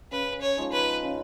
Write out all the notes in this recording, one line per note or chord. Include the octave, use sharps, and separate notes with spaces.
C#3 B4
C#5
F3 G#3 D#4
B4
C#3